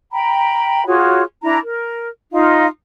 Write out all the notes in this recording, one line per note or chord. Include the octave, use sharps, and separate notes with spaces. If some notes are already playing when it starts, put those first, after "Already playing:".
G5 A#5 B5
F4 F#4 G#4 C#5
D4 E4 A#5
A#4
D#4 F4 F5